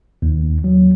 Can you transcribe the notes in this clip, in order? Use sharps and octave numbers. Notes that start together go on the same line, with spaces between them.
D#2
F#3